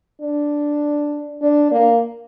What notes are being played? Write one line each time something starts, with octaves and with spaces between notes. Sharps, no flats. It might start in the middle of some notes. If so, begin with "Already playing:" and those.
D4
D4
A#3